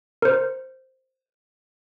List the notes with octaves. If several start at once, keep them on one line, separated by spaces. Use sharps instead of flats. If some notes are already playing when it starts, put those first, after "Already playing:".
A#4 C5